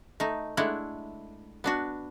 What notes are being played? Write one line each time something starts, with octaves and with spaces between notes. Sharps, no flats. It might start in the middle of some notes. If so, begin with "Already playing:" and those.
A3 D#4
G#3 A3 D4 E4 F#5
B3 D4 F#4